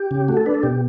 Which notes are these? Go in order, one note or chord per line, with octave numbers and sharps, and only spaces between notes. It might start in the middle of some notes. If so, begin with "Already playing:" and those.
Already playing: G4
C#3
A3 F#4
A4
D4 B4
A4
B2 G4